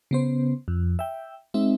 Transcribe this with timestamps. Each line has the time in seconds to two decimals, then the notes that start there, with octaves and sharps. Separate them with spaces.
0.11 C#3 B3 C5
0.68 F2
0.99 E5 G5
1.54 G#3 C4 D#4 E5